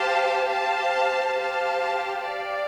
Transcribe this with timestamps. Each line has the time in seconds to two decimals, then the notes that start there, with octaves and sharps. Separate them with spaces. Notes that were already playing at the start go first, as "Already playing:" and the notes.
Already playing: G4 C5 F5 A5
0.47 G4 C5 F5 A5
1.38 G4 C5 F5 A5
2.28 G4 D5 F5